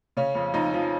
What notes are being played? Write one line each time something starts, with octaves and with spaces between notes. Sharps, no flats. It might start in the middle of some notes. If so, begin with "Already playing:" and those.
C#3 C#4
F2
F2 D#4
F3